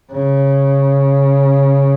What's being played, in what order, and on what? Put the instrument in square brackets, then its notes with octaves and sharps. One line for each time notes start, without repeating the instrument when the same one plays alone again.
[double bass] C#3